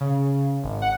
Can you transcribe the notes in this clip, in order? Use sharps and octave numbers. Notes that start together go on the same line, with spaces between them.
C#3
G#1
F#5